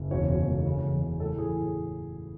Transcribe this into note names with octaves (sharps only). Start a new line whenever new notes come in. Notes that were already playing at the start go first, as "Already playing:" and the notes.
Already playing: F#1
E1 C#5
E1
A3
C#3
E2
C#3
A2 A4
E3 G#4